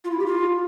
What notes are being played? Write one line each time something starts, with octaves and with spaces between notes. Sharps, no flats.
F4
E4
G4
F4